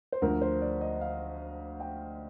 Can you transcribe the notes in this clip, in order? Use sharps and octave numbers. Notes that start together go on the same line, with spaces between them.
C5
D2 D3 F3 A#4
C5
D5
D#5
F5
G5